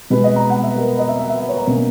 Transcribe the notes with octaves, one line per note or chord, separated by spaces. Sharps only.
B2 G#3 B3 B4
D#5
A#5
F#5
E5
A#4
D#5
E5
E5
E5
C#5
A#5
B2 A#3 C#4